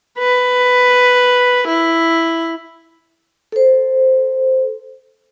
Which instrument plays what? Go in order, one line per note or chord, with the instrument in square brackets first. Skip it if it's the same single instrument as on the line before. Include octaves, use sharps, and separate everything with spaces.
[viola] B4
E4
[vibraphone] A4 C5